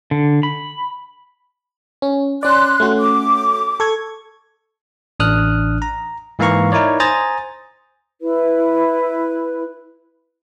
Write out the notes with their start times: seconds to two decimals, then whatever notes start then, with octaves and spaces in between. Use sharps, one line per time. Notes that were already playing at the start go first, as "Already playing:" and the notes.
0.11 D3
0.43 B5
2.02 C#4
2.43 C#4 D5 C6 F#6
2.80 A3 C#4 F#4
2.99 D6
3.80 A4 C#6 G#6
5.20 A1 D4 D#6 F6 F#6
5.82 A#5
6.39 G#2 E3 A#3 F5 A#5 C#6
6.72 D#4 E4 A#4 C#5 D5
7.00 C5 G#5 A#5 D#6 A6
8.21 E4 B4